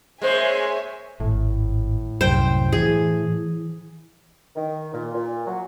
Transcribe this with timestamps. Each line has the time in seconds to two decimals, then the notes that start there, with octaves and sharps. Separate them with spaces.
0.22 G#3 A#3 C5 C#5 E5 G#5
1.20 G#1 A2
2.21 C2 F#2 C5 G5
2.72 E3 G#4
4.56 D#3
4.94 A#2
5.14 A#2
5.47 F#3